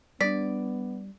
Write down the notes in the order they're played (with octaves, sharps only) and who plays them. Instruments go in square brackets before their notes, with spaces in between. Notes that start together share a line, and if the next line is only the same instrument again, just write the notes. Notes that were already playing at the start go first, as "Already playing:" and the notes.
[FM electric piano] G3 D4 [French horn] B3 [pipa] D5 [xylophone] B6